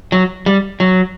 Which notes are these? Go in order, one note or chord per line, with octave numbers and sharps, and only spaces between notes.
F#3
G3
F#3